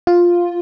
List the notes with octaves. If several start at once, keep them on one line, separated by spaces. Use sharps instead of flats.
F4